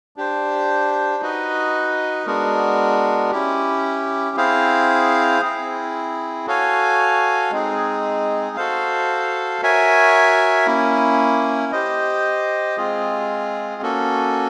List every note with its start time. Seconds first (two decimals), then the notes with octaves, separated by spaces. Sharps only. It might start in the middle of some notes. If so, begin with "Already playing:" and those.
0.16 D4 G4 C5
1.21 D#4 F#4 B4 D#5
2.26 G#3 B3 D4 F#4 A#4
3.31 C#4 E4 G4
4.37 C4 E4 G#4 C5 F5
5.41 C4 E4 G#4
6.47 F#4 A4 C#5 F5 G#5
7.51 G#3 C4 D#4 G#4
8.56 F#4 A4 C5 F5
9.62 F#4 A#4 C#5 E5 G#5
10.66 A#3 C#4 E4
11.72 G4 C5 D#5
12.77 G#3 C4 F4 G#4
13.82 A#3 C#4 F#4 A4